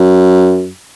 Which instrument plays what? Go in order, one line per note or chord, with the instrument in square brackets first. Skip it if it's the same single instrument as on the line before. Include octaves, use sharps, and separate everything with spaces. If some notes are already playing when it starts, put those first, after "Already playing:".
Already playing: [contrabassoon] F#2